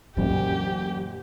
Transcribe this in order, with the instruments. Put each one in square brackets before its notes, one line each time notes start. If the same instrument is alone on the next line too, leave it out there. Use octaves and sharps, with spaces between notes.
[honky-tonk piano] F#1 D2 A#2 [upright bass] E3 F#3 [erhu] G4